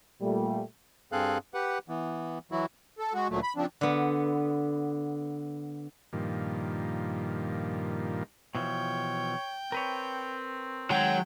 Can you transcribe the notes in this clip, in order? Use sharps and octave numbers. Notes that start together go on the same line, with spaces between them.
A#2 G3 A3
G2 C4 G#4 A4 F5 F#6
G4 B4 F#5
E3 B3
E3 F#3 E4 F#4
A4
G#3 F#4
D2 A#2 F#3 A3
B5
C#3 F3 C4 D4
D3 B3
G2 A#2 D#3 F3
B2 E3 F3 C#5 G5
C4 A#4 B4 C#5
D#3 F#3 G#3 G#4 G5